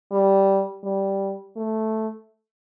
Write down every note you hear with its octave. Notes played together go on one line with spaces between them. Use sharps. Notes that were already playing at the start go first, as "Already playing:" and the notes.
G3
G3
A3